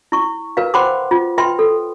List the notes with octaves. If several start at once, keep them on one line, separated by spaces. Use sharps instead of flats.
E4 C#6
A#4 B4 F5
C5 F#5 G5 B5 C6 D6
F4
B4 E5 G5 B5 C6
A4